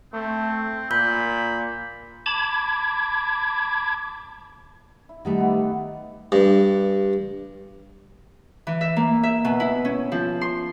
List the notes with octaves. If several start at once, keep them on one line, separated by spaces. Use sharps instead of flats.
A3 C4
A#2 B5 G6
A5 B5 D6 G#6
E4
D#3 G3 A3 B3 D#4 B4
B3 E4 G4
G2
E3
E5
A#3
E5
B2
E4
C#4
F3
C6